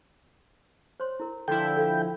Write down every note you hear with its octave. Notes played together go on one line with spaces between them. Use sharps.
C5 C#5 C6
E4 A#4
D3 F3 E4 A4 G5
A4 F5